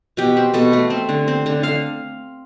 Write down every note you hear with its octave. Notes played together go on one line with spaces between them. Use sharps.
B2 G4
C4
B2 A4
A3
C4
D3
C4
D3
D3 F5